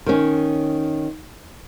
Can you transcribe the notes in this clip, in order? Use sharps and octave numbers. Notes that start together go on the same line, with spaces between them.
D#3 C#4